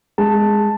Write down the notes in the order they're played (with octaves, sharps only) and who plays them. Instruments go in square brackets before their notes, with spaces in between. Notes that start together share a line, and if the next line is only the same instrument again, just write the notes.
[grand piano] G#3 A5